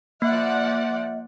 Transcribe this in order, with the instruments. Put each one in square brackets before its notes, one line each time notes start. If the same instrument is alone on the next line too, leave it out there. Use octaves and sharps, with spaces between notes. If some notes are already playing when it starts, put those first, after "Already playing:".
[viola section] F3 D5 F#5 [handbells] A#3 [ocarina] E5